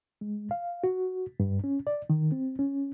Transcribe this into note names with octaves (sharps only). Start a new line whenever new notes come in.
G#3
F5
F#4
G2
C#4
D5
D#3
C4
C#4